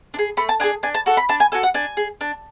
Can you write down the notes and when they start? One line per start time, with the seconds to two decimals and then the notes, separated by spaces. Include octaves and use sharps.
0.14 D4
0.19 G#4
0.37 A3 B5
0.49 A5
0.60 D4 G#5
0.63 G#4
0.83 D4 G#5
0.95 A5
1.06 F#4 A4
1.17 B5
1.29 D4 A5
1.40 G#5
1.52 F#4 A4 G#5
1.63 F#5
1.74 D4 G#5
1.97 G#4
2.21 D4